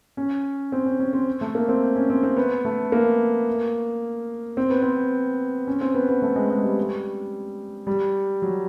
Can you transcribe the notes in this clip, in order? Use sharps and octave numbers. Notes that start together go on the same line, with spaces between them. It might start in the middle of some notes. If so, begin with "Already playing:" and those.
C#4
C4
C#4
C#4
C4
A3
A#3
C4
C#4
C4
C4
B3
A3
A#3
C4
B3
C4
C#4
C4
B3
B3
A3
G#3
G#3
G3
G3
F#3